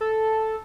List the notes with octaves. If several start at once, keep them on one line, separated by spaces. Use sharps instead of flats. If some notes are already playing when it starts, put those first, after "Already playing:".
A4